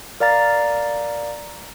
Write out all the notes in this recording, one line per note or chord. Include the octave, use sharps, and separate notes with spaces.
A#4 D5 F5 A#5 A6